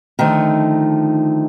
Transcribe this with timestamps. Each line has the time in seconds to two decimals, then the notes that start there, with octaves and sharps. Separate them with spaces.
0.19 D3 D#3 F3 A3 D#4